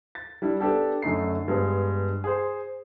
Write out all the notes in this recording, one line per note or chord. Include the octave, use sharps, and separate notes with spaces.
A6
G3 D4 E4
B3 D4 G4 A4
F#2 D3 A3 D#4 C7
G2 G#3 B3
G#4 C5